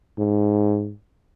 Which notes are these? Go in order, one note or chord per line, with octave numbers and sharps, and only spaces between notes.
G#2